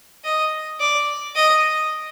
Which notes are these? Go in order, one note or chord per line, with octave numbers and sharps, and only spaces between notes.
D#5
D5
D#5